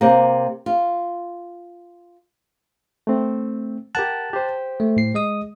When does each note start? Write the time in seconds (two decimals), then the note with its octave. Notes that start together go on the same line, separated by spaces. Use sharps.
0.01 C3 A#3
0.66 F4
3.07 A3 C4
3.95 G4 A#4 F#5 A5 F#6
4.33 G4 C5
4.80 A3
4.97 A2 C7
5.14 G#3 D#5 D#6